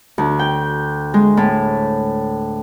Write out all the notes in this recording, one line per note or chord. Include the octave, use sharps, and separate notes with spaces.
D2
G5
G#3
A2